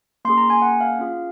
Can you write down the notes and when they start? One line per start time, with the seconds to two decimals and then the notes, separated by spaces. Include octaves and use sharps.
0.25 A#3 C#4 G#4 C6
0.37 A#5
0.50 G#5
0.62 F#5
0.81 F5
0.99 C#4 F4 G#4